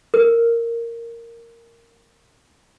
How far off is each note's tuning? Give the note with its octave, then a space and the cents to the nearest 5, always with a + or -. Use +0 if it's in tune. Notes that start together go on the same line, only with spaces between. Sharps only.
A#4 -10